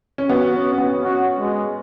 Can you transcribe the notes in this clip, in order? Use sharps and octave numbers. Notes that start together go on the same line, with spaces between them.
C#4
B3 F#4
C#4
C#4
B3
C#4 F#4
G#3